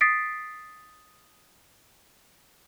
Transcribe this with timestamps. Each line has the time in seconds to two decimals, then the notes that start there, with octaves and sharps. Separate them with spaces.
0.01 D#6 A6 B6 C7 D7